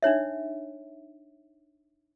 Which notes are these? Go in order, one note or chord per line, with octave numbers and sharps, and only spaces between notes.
D4 D#4 C#5 E5